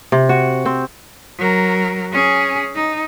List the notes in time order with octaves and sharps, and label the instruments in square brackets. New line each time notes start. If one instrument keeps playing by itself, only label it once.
[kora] C3
F#4
C4
[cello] F#3 A#4
C#4 G#4
D#4